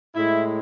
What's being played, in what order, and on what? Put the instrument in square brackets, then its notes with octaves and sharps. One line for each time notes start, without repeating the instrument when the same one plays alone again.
[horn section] A2 G#3 E4